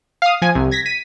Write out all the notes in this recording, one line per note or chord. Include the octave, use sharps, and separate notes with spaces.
F5 D#6
F3 G#5
C2
G#6 A#6 B6
B6 D#7